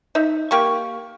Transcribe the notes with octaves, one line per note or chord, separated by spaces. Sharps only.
D#4 E5
A#3 G4 C#6